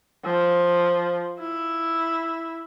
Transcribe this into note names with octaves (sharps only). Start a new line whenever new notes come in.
F3
E4